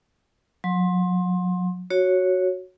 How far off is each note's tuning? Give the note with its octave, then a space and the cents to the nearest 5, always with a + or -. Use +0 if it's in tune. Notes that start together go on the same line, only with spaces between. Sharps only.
F#3 -35 C6 +20
F#4 +0 C#5 +0